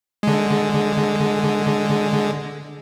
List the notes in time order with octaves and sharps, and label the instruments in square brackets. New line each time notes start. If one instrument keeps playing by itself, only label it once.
[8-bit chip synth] D3 G#3